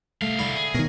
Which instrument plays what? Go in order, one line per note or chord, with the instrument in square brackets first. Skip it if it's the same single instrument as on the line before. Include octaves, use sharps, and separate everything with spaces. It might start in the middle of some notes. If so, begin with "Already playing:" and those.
[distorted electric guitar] C2 F5 [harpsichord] A3
[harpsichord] D3 E4 C#6
[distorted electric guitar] G#4
[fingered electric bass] B2 D#3 [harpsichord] A#4 C#5